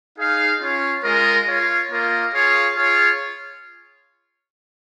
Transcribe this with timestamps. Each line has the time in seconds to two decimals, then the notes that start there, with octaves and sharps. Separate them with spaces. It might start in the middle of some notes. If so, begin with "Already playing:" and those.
0.17 D#4 G#4 F5
0.61 C#4 F4 C#5 F5
1.04 G#3 F4 A#4 D#5
1.47 F4 C#5 F5
1.90 A#3 F4 A#4 D#5
2.33 F4 G#4 C#5 F5
2.76 F4 G#4 C#5 F5